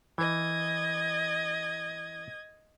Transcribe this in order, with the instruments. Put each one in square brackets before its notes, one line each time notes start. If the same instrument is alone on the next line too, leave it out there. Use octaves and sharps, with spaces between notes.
[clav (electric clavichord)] E3 [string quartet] D#5 G#6